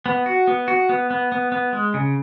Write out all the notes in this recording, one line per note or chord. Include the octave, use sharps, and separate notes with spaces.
B3
F#4
B3
F#4
B3
B3
B3
B3
G#3
C#3